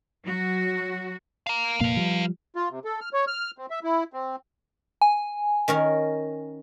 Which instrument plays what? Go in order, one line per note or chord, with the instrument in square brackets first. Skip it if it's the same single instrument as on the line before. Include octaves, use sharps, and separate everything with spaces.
[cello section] F#3 F#4
[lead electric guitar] F5 A#5
[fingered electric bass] F1 A#2 A#3 [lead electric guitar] B4 F5
[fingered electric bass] F3 G3
[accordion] F4
C3
A4
F6
C#5
F6
C4
E5
E4
C4
[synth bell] G#5
[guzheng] D#3 C#4 A#4